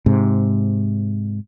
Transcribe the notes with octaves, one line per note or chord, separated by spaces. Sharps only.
G#2 C3